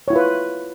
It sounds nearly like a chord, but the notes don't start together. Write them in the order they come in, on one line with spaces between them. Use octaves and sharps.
C#5 E4 F4 B4